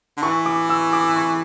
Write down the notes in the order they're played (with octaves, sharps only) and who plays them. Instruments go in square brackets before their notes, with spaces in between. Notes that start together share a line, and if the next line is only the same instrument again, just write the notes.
[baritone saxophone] D3
[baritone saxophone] E3 [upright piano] C#6
[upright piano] D6
E6
D6
C#6